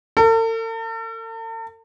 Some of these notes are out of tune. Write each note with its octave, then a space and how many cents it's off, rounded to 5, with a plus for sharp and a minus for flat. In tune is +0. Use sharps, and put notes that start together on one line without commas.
A4 +45